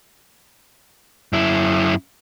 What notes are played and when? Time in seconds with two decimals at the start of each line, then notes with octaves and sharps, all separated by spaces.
1.33 F#2 E4